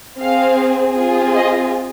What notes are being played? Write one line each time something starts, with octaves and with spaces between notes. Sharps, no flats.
C4 G#4 F5
C4 F4 G#4
D#5